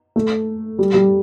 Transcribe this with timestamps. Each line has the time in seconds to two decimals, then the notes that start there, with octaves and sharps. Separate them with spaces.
0.16 A3
0.79 G3
0.94 G3